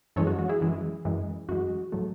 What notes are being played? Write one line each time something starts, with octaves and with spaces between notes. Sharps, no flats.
F#2 E3 G#3 A4 C#5
F#4
F#4
E4 G#4
F#2 E3 G#3
F#2 E3 G#3
F#2 E3 G#3 F#4
A2 F#3 A3